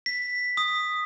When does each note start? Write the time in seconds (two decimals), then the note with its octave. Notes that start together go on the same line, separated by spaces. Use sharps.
0.06 B6
0.57 D#6